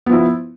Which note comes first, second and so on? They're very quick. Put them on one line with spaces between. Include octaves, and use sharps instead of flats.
B3 F3 E4